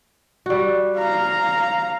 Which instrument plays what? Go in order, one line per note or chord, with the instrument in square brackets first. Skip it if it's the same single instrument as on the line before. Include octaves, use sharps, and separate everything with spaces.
[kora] G3 F#4
[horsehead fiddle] F5 A#5